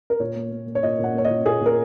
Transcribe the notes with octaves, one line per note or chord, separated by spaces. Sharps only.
A#4
A#2 C#5
A#3
A#3
A#3
C#5
A#2 D#5
A#2
F#5
A#3 C#5
D#5
A#2
A#2 G#4
A#2 A#4